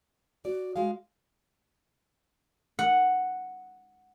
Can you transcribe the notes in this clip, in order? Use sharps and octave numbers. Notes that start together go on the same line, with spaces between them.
F#4 D5
G#3 F#4 G#4 F5
F#5